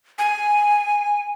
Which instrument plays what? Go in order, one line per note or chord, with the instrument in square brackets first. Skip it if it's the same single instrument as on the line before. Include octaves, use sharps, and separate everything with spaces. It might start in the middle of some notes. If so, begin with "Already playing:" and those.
[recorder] G#5